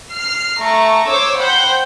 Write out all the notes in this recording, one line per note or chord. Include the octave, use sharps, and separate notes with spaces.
F6 C7
A3 A#5 C#6
C5 C#5 D6 E6
C5 F#5 G5 B5 G6